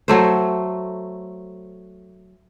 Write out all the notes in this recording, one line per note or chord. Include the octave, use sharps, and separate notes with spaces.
F#3 A3 C5